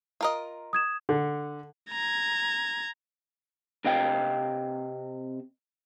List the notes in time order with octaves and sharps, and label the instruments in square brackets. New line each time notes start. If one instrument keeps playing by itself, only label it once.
[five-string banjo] F4 A#4 D#5
[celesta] D#6 G#6 E7
[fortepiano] D3
[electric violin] A#5 G#6
[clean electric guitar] C3 C4 D#5 F5 G5